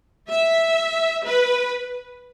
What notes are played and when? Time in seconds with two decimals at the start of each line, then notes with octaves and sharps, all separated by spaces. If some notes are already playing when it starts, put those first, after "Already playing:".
0.29 E5
1.24 B4